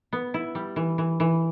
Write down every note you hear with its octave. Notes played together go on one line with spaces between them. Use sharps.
B3
E4
G3
E3
E3
E3